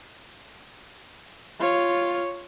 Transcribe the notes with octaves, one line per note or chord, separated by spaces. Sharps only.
F4 C#5